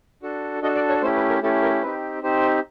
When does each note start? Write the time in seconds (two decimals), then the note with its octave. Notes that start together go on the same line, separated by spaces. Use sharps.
0.23 D4 F#4 A4
0.62 D4 F#4 A4 D#5
0.75 D5
0.89 C#5
1.02 A3 C#4 E4 G4 C5
1.16 B4
1.30 A#4
1.42 A3 C#4 E4 G4 A4
1.62 A#4
1.82 C4 D#4 G4 B4
2.23 C4 D#4 G4 C5